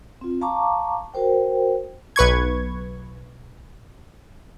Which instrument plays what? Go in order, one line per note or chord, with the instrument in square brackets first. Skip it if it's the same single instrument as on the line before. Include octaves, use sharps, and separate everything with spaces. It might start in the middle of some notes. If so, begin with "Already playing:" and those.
[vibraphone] C4 F4
F5 A5 A#5 C#6 D6
F#4 A#4 C5 G5
[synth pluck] B1 B4 C#6 G#6